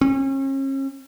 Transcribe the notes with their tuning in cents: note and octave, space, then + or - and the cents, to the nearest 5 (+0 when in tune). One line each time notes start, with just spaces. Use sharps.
C#4 -40